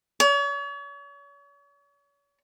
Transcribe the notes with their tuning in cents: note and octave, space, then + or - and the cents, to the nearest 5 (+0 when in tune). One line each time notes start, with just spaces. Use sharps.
C#5 +40